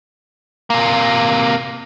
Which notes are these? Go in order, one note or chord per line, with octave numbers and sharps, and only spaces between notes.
C3 A#3